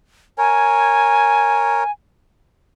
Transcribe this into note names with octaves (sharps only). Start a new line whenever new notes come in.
A#4 C#5 G#5